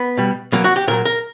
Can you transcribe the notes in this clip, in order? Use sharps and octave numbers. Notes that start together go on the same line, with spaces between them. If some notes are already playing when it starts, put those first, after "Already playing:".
Already playing: B3
B2 G3
B2 F#3 A#3
F#4
G4
A#2 F#3 A#4
A#4